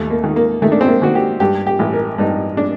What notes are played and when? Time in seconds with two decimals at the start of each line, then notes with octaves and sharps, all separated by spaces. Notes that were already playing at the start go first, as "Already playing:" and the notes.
Already playing: D#2 A3
0.10 A#3
0.24 D#3
0.36 A#3
0.62 D#3 A3
0.72 D4
0.81 C4
0.88 A#3
1.02 D#3 F#4
1.15 G4
1.40 G2 G4
1.67 G4
1.79 A1
1.93 A#4
2.18 G2 D#4
2.57 D4